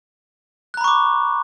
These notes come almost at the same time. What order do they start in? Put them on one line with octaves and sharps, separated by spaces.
F#6 A#5 B5 C#6 D6